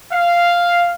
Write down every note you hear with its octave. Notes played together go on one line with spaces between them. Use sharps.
F5